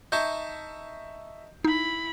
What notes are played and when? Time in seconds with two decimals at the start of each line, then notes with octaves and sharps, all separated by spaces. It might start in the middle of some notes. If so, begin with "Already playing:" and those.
0.12 D#4 E5 A5 C#6 G6
1.64 D#4 E4 B5